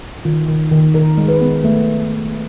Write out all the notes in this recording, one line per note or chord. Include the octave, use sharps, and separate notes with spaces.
D#3 F4
D#3
D#3
D#3 A#4
G#3
B4
B3
A3